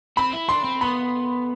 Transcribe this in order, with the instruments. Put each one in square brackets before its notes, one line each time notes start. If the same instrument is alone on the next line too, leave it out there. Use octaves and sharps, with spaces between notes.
[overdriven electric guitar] C4 [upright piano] B5
[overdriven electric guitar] E4
[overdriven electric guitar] D4 [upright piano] C6
[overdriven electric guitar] C4
[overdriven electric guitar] B3 [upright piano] B5